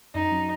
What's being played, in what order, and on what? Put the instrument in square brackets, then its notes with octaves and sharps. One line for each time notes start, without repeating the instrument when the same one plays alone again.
[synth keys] F#2 [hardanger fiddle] D#4
[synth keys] F#3 C#4